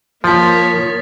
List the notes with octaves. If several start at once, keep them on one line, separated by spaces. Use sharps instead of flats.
F3 A#3 C#5 D#6 A6 B6